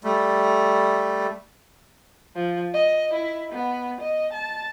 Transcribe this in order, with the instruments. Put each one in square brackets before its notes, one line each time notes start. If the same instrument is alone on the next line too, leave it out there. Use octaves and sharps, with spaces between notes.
[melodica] G3 A3
[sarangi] F3
D#5
E4
B3
D#5
A5